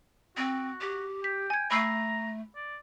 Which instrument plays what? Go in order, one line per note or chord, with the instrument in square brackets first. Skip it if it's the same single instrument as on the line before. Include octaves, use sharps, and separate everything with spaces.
[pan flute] C4 [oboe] F#4
[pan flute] G4
[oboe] G5 [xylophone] B6
[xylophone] G#5 G#6
[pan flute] A3 [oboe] A#5 [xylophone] B5 E6 C7
[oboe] D5